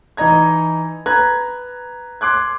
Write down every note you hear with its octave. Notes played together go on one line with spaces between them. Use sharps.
E3 D#4 D#5 A#5 G#6
B4 A#5 F#6 G#6
C6 D6 F#6 G#6